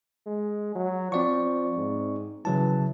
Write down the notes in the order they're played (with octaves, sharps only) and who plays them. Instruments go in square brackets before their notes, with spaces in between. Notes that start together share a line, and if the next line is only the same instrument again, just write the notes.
[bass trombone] G#3
F#3
[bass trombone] F3 [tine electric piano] C4 D5 C#6
[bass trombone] G#2
[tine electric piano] C#3 F#3 A5 [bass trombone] E3